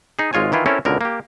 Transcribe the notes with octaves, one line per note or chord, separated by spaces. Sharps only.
D#4 G#4
G#1 G#3 F4 C#5 G#5
D#3 E3 E4 F4
C4 C#4 E4 A4 A#4 C#5
C#2 B2 D3 A#4
A#3 G4